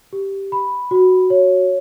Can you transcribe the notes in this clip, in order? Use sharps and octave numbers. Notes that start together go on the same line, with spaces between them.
G4
B5
F#4
C#5